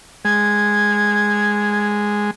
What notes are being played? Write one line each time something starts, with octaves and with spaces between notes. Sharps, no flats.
G#3 G#6